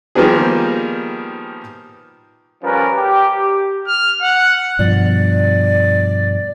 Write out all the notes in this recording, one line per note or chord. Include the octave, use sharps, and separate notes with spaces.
D#3 F3 G3 A#3 B3 G#4
F3 G3 C#4 A#4 B4
G4
F6
F#5
G2 B2 F3 D5